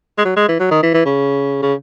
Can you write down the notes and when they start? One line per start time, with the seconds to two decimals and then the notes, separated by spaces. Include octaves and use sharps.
0.18 G#3
0.25 F#3
0.36 G#3
0.48 E3
0.60 F#3
0.71 D#3
0.83 E3
0.94 E3
1.05 C#3
1.62 C#3